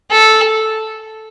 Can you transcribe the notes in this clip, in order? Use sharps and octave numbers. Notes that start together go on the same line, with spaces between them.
A4